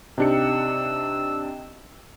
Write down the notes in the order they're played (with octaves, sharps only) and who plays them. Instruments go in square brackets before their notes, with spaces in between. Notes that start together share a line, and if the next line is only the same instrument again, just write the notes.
[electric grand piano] C3 D4 C#7 [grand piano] D#4 G4 [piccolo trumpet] E6